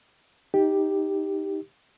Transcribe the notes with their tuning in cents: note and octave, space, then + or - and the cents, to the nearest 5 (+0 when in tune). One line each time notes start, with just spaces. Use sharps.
D#4 +10 G4 +0